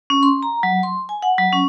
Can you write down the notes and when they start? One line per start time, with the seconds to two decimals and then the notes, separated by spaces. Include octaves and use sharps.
0.10 C#4
0.23 C6
0.43 A#5
0.63 F#3
0.83 C6
1.09 G#5
1.22 F#5
1.38 F#3
1.52 C#4